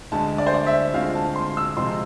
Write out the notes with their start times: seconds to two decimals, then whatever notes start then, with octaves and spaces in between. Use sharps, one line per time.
0.12 D2 D3 G#3 A5
0.38 D5
0.47 C5
0.54 D5
0.67 E5
0.94 D2 D3 G#3 C4 F4 F5
1.15 A5
1.36 C6
1.57 E6
1.77 C3 F3 G#3 C4 F4 C6